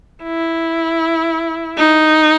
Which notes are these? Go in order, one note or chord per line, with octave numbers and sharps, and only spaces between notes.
E4
D#4